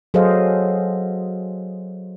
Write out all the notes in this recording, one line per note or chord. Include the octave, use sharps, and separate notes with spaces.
F#3 G#4 A4 C5 D#5 F5